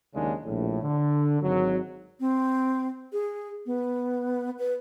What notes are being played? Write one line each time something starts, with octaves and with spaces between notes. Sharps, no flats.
F#1 D#2 C#3 G#3 D4
A#1 A2
D3
G#1 F#3
C4
G#4
B3
B4